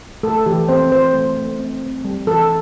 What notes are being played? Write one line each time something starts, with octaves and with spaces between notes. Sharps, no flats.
A3 A4
E3 G4
C4 C5
E3 C5
A3
A3
C4
C4
G3
E3 A4